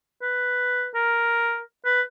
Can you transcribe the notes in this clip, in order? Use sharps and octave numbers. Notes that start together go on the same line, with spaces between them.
B4
A#4
B4